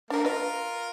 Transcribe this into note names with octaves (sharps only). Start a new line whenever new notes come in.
A3 A#3 D4 A#4
F4 A#4 B4 D#5